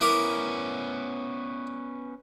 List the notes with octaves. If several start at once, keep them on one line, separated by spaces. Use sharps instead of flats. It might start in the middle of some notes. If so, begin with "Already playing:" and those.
B3 C#4 E4 A#4 D6